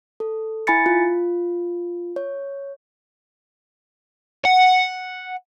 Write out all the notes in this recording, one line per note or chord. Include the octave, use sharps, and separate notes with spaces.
A4
E4 G#5 B5 A6 C#7
F4
C#5
F#5